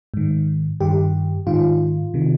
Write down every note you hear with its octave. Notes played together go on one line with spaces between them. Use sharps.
G#2 D#3
G2 D#3 G4
G#2 D#3 F4
C3 D#3